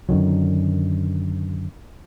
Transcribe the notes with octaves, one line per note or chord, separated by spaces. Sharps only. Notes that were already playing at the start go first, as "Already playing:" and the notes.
F#2 D3 D#3 F#3